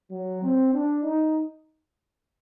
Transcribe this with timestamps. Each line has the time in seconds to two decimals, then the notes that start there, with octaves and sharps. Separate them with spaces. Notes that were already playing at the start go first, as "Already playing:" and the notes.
0.12 F#3
0.43 C4
0.74 D4
1.04 D#4